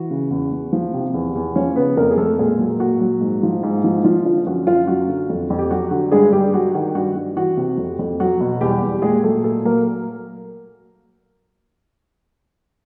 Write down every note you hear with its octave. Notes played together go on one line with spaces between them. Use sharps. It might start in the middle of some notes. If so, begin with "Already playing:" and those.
Already playing: E3 F#4
C#3
E2
E2
F3
C3
E2
E2
F3 C#4 C#5
C#3 B3 B4
F2 A#3 A#4
G#4
F2 A3 A4
A#2 G#3 G#4
F#3
A#2 F#4
F#3
G#2
F3
G#2
F3
F3 F4
D3 F4
F#2 F#4
F#2 F4
F#3 F#4
D3
F2
F2
G4
F#3 F#4
D3 F#4
G2 G#3 G#4
G2 G3 G4
F#3 F#4
D#3 F#4
G2 F#4
G2 F#4
E3 F#4
C3
F2
F2
F#3 F#4
B2
E2 G3 G4
E2
A#2 G#3 G#4
F#3 A3 A4
A#2 A3 A4
F#3 A#3 A#4